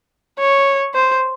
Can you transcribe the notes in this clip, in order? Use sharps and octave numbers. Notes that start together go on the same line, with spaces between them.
C#5
C5